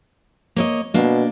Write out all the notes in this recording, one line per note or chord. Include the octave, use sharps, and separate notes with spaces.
A#3 C#5 D#5
B2 A#3 D4